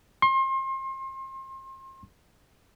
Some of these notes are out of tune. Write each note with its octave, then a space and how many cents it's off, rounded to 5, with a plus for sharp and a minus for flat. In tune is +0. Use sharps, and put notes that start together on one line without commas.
C6 +35